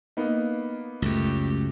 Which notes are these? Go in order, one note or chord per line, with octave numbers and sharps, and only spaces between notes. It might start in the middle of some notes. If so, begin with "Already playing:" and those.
A#3 B3 D#4
C#2 F#2 A3 G4